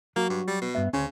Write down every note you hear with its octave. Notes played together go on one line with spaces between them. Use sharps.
F#3 A#3 F#4
G2
G3
B2
G2 B3 E5
D2 C#3 C#4 C6